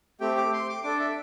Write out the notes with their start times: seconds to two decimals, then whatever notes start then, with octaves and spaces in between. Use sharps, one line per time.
0.20 A3 C4 G4 G5
0.37 D6
0.53 C6
0.69 D6
0.84 D4 A4 D6
1.00 E5